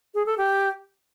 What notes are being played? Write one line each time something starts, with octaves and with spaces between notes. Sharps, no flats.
G#4
A4
G4